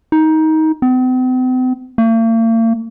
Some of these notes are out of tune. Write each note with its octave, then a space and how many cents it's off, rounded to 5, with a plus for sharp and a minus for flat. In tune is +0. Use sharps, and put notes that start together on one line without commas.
D#4 +20
C4 -45
A#3 -45